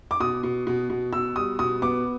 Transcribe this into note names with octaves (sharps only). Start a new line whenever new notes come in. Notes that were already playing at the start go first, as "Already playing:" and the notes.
D6
B2 D#6
B2
B2
B2
B2 E6
G3 D#6
B2 D#6
B3 D6